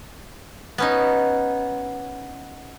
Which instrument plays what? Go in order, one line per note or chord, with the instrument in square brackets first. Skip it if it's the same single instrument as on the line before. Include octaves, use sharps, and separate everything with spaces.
[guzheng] B3 C#4 D#4